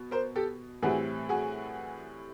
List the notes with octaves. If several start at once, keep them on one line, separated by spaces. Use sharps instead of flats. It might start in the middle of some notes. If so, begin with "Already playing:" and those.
Already playing: B2
A#4 C5
G4 A4
A2 E3 G3 C4 F#4 G#4
F#4 G#4